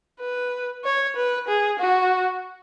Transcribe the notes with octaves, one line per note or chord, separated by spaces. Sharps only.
B4
C#5
B4
G#4
F#4